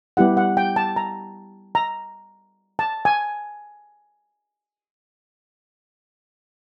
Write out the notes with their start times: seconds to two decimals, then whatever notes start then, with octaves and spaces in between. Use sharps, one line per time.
0.17 G3 B3 E4 G4 F#5
0.37 F#5
0.57 G5
0.76 A5
0.96 A#5
1.75 A#5
2.79 A5
3.05 G#5